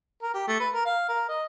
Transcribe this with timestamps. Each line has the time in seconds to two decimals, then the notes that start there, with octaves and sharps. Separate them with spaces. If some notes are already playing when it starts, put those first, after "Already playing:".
0.23 A#4
0.34 G4
0.48 A3
0.60 B4
0.74 A#4
0.86 F5
1.09 A#4
1.29 D#5